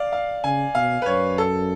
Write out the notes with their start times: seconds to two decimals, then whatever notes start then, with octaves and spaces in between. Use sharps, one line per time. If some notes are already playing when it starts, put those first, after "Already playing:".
Already playing: D5 F5
0.12 F5
0.44 C#3 G#5
0.75 B2 F5
1.02 B4
1.06 F#2 C#5
1.38 A4